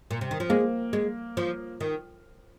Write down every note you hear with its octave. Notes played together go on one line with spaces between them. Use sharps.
A#2
C3
D#3
F3
G#3 A#3
G#3
F3
D#3